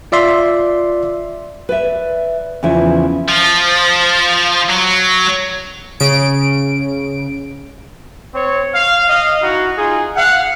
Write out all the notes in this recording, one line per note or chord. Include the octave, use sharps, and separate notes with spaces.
F4 D5 E5 C6
B4 D5 E5
E2 C#3 F3 E4
F3
F#3
C#3 D7
C4 C#5
F5
D#5 F5
D#4 E4 F#4
D#4 F4 G#4
F5 F#5